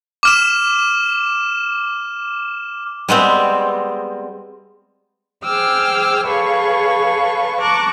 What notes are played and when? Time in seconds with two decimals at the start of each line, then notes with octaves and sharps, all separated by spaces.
0.23 D6 F6 E7
3.08 G3 G#3 B3 C4
5.43 G#4 C5 G5 D6 E6 F6
6.27 G#4 A4 B4 C#5 F5 C#6
7.59 A5 A#5 C#6 D6 F#6